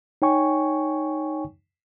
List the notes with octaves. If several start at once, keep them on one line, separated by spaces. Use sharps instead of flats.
D#4 C#5 G5 G#5 C#6